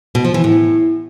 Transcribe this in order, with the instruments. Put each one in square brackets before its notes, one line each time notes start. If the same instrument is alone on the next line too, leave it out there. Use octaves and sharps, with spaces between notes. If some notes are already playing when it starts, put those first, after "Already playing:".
[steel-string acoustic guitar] B2
F3
E3
A2